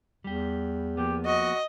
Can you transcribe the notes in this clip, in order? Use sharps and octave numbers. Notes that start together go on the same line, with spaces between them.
E2 G3 G4
F3 A#3 B3 G4
F#4 D#5